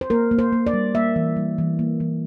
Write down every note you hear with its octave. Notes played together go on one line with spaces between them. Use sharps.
C5
A#3 A#4
A#3
C5
A#3
D5
G3
A#3 E5
E3
G3
E3
A#3
E3